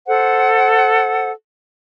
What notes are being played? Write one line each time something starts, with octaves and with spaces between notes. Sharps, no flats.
A4 C5 F#5